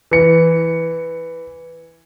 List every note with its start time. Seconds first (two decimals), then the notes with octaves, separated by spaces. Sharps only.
0.11 E3 C#7